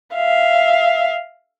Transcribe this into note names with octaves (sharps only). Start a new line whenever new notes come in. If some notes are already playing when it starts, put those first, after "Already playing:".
E5 F5